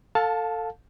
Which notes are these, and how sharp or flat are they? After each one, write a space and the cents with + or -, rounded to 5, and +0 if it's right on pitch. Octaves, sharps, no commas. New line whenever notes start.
A4 +20 F5 +25 A5 -10